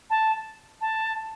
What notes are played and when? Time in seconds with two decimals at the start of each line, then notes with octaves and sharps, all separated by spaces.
0.10 A5
0.81 A5